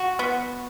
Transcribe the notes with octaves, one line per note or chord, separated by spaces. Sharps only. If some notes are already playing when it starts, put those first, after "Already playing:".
Already playing: F#4
B3